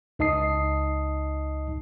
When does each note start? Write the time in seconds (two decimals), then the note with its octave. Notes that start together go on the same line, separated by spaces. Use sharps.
0.19 C#2 D#4 D#5 A5 D#6 C7